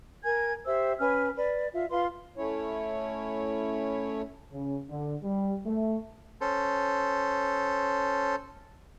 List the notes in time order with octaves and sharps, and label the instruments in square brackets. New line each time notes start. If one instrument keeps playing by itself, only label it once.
[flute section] A#4 G#5 G#6
G4 C5 E5 E6
C#4 B4 G#5 F6
B4 D5
F4 E5
F4 B4 F5 C6
[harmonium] A3 C#4 E4 C#5
[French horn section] C#3
D3
G3
A3
[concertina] C#4 A4 C5